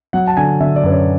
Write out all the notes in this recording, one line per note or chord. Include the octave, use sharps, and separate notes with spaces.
F#3 F#5
A5
D3 G#5
D3 E5
D5
F#2 B4
C#5